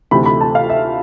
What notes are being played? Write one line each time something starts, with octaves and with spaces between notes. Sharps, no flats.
D2 C3 E3 A3 B5
B5
A5
F5
E5